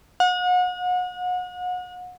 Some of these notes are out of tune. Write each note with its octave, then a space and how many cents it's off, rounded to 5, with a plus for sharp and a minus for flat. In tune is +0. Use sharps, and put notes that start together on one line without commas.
F#5 -35